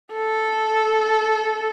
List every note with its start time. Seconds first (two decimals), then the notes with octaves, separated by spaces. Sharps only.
0.13 A4